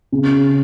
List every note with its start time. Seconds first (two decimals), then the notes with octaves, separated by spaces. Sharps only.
0.12 C#3